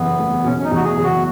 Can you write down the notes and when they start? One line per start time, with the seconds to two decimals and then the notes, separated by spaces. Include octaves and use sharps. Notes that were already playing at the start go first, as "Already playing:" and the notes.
Already playing: F#1 E2 B3
0.19 A3
0.44 B2 C#4
0.58 C#4
0.64 D#4
0.72 E2 F#4
0.84 G#4
0.98 F#1
1.03 F#4